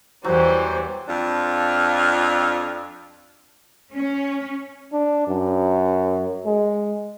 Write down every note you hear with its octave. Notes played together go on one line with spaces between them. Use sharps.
E2 E3 F#3 G3 C5
F2 D4 F4
C#4
D4
F#2
G#3